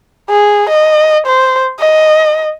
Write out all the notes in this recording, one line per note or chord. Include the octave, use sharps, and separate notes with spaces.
G#4
D#5
C5
D#5